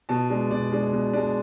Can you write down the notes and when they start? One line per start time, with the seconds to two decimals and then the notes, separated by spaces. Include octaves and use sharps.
0.09 B2 A5
0.30 G#3 D4
0.51 B2 D5
0.71 G#3 D4
0.93 B2
1.13 G#3 D4